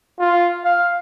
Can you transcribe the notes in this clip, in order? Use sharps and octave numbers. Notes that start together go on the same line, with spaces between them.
F4
F5